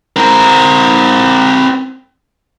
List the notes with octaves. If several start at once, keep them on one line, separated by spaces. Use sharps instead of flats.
C4 A#4